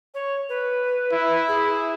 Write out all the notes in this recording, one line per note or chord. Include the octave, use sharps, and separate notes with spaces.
C#5
B4
E4
G#4